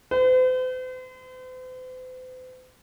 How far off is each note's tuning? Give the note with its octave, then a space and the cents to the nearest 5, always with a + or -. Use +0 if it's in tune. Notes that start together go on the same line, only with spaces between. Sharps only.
C5 -45